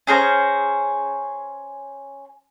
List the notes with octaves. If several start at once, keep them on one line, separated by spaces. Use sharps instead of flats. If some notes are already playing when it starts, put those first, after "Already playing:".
C#4 G#4 C5 A#5